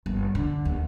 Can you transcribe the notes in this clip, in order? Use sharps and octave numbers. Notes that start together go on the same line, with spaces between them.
G1
D3
D#2